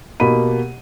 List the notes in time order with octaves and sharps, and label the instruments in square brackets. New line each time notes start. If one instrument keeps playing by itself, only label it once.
[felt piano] B2 A#3 G4 B5 D#7